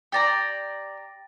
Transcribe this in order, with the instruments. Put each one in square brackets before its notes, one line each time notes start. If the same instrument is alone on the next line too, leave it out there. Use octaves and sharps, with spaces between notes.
[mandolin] G4 D5 A#5 [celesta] G5 A6 A#6